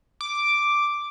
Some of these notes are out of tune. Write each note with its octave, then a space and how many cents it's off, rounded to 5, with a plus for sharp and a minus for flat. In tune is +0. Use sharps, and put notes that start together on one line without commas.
D6 +0